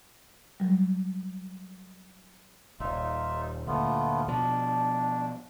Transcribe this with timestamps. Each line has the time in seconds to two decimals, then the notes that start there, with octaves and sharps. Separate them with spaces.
0.60 F#3 G3
2.80 D#1 G#1 D#4 F4 E5
3.67 D2 A#2 A3 B3 F4
4.28 B2 F3 D4